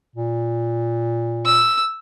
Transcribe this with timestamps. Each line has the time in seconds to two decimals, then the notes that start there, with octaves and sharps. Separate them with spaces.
0.16 A#2
1.46 E6